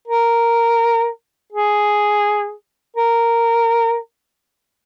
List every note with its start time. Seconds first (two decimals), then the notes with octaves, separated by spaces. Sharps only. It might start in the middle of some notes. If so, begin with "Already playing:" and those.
0.08 A#4
1.52 G#4
2.97 A#4